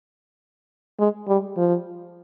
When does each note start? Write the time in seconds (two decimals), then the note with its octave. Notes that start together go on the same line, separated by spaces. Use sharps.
0.99 G#3
1.28 G3
1.57 F3